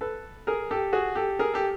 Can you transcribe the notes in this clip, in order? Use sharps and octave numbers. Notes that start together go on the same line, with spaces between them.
A4 B4
G#4 A#4
G4 A4
F#4 G#4
G4 A4
G#4 A#4
G4 A4